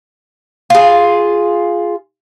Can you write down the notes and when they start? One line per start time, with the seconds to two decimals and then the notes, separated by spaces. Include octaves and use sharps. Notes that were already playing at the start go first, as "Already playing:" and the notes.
0.70 F4 G#4